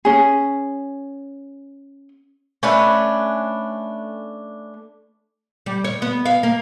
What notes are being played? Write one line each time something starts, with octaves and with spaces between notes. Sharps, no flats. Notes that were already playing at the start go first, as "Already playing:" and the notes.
C#4 G#4
A3 C#4 D4 B4
G3
C#5
B3
F5
A#3